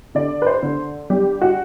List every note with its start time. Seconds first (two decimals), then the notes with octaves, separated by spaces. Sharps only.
0.15 D3 D5
0.42 B4
0.47 C5
0.63 D3
1.10 G3 G4
1.41 F#4